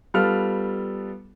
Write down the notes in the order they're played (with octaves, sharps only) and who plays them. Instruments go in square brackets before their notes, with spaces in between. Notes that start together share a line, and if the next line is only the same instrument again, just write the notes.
[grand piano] G3 B3 F4 A4 F6